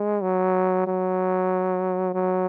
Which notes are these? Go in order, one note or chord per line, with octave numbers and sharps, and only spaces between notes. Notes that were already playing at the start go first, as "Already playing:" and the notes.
Already playing: G#3
F#3
F#3
F#3